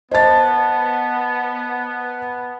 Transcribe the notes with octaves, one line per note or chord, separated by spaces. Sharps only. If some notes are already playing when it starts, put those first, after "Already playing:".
B3 C5 D#5 A5 A6